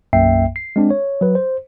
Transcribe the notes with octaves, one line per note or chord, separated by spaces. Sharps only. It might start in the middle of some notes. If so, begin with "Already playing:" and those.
B1 F#2 A#3 E5 G5 C7
C7
G#3 C4 D4
C#5
F#3 B4
C5